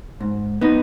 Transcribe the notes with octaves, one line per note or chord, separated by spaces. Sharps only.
G#2
B3 D#4